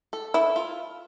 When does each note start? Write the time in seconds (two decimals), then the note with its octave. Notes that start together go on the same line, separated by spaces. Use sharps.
0.13 A4
0.34 E4 A4
0.56 F4